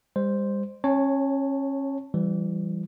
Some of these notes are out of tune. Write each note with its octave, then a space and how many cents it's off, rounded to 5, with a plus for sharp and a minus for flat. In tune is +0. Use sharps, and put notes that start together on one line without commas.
G3 +45 C5 +0
C#4 -30 C#5 +0 A5 +0
E3 +30 G3 +0